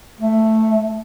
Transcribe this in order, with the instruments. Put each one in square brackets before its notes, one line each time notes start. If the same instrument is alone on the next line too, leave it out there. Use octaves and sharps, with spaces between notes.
[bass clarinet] A3